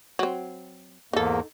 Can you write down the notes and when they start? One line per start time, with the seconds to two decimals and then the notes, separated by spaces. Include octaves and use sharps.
0.19 F#3 C4
1.13 E2 G#2 A#3 D#4 A4